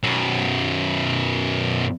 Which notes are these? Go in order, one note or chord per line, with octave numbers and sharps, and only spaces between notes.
F#2 B2